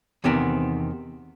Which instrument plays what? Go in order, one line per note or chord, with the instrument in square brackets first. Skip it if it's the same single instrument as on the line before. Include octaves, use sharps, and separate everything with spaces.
[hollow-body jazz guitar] E2 C3 D#3 B3 C4